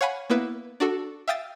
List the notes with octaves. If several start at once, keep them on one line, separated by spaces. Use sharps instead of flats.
C#5 F5 F#5 G#5 B5
A#3 B3 E4 B4
D4 F#4 A4
E5 F5 G5 D#6 A6